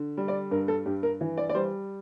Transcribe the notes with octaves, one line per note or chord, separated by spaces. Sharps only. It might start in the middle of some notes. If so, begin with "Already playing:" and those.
Already playing: D3
G3
D5
G2 A#4
A4
G2 G4
A#4
E3
D5
D5
G3 C5